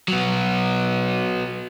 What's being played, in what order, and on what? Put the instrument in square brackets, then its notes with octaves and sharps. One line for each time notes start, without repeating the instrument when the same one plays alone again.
[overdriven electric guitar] F#3 B3